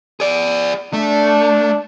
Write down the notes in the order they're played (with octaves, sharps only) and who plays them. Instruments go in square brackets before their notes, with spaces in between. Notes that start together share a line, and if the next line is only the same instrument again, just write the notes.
[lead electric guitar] G#4 D5
[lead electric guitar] A3 [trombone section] D4